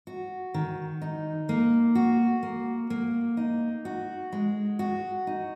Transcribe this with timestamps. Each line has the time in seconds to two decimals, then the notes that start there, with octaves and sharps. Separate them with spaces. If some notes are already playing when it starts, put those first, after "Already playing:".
0.07 F#4
0.54 D#3
1.02 D#4
1.49 A#3
1.95 F#4
2.43 A#3
2.90 A#3
3.37 D#4
3.85 F#4
4.32 G#3
4.79 F#4
5.27 D#4